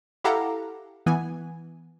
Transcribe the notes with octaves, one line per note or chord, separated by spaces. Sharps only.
E4 G4 A4 F5 F#5 A#5
E3 B3 G#5